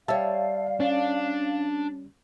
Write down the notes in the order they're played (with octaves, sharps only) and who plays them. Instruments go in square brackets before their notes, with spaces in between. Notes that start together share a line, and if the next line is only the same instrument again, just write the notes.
[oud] G3 C#5 [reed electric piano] E5 A5 [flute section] F5
[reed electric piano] C#4 [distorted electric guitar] D4